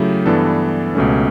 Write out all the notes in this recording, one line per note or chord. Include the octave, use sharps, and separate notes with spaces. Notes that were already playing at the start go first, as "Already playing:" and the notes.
Already playing: C#3 F#3 A3 E4 G4
G2 E3 B3 D4 A4
C#2 B2 A3 C#4